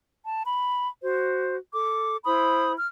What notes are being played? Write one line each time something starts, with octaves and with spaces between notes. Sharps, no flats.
A5
B5
F#4 C5
A4 D6
E4 C5 B5 D#6
F6